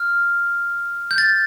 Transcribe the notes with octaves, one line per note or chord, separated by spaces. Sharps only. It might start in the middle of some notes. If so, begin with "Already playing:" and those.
Already playing: F6
G6
A6